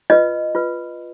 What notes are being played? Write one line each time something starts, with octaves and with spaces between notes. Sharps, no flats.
F4 B4 D#5
F4 B4